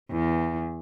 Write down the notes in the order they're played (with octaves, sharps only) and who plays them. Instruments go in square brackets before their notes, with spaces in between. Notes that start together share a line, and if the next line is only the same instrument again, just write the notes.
[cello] E2